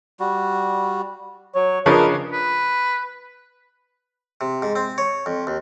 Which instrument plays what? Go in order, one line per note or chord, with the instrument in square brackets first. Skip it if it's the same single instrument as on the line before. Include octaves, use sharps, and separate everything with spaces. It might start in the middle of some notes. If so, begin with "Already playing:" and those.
[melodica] G3 F#4
[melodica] F#3 [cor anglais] C#5
[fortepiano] C#3 F3 D4 [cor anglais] A#4 [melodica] B4 D#5
[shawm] B4
[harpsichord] C3
G#2
C4
C#5
F2
D#2